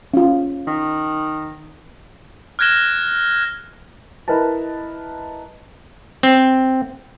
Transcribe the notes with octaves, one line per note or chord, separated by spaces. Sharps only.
C#4 F4
D#3
F6 F#6 G#6 A#6 E7 G7
E4 A#4 B4 D#5 A5
C4